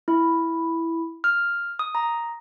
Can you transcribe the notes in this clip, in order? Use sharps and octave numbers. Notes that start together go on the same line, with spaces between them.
E4
F6
D#6
A#5